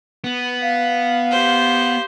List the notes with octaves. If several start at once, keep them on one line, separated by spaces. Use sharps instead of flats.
B3
F5
G4 C5